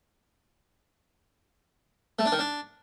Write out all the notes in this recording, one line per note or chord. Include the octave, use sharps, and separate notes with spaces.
A3
D4
D#3
D4